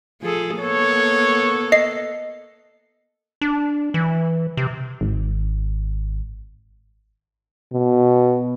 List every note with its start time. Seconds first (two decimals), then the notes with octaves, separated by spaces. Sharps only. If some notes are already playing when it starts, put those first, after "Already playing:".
0.22 F3 G#4 A4
0.59 A#3 B3 A4 C#5
1.72 D#5 C7
3.41 D4
3.94 E3
4.57 C3
5.01 G#1
7.73 B2